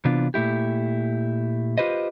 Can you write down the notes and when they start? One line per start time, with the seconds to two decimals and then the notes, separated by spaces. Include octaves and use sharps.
0.05 C3 E3 B3 D4 F4
0.34 A#2 A3 E4 G4
1.78 F4 G4 B4 C5 D#5